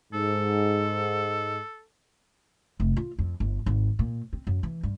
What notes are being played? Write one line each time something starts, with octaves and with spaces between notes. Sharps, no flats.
G#2 A4
F1
F4
F2
G1
G#1
A#2
C4
F#2
E3
G2